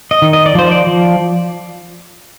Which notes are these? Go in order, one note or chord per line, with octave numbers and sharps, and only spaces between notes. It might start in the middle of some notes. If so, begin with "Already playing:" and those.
D#5
D#3
D#5
D5
F3 C5
D5
F3